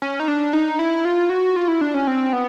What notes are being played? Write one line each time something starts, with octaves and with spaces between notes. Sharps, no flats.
C#4
D#4
D4
D#4
E4
F4
F#4
F4
E4
D4
C#4
C4
B3